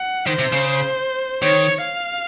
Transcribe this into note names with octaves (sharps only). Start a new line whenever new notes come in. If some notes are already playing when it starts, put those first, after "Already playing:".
Already playing: F#5
D#3 C5
C3
C#3
D#3 C#5
F5